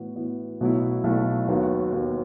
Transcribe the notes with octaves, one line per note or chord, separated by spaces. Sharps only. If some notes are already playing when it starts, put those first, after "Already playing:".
Already playing: A2 E3 B3 F#4
A2 E3 B3 F#4
B1 B2 F#3 A3 E4
B1 B2 F#3 A3 E4
D#2 D#3 F#3 B3 F#4
D#2 D#3 F#3 B3 F#4